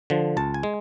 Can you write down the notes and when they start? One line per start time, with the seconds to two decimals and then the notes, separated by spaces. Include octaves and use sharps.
0.10 D3 F3
0.37 C#2 A5
0.54 G#5
0.63 G#3